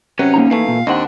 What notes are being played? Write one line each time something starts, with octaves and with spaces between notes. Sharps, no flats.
C3 F#3 C#4 B4
A#3 D#4 A#5
E3 A3 F5
A#2
D#2 C4 D4 D#5 F#5